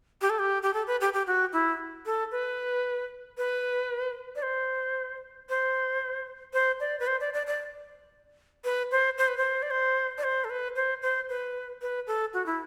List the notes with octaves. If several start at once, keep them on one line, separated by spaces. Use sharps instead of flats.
G4
A4
G4
G4
A4
B4
G4
G4
F#4
E4
A4
B4
B4
D5
C5
C5
C5
D5
B4
C5
D5
D5
D5
B4
C5
C5
B4
C5
D5
C5
D5
C5
A4
B4
C5
C5
B4
B4
A4
F#4
E4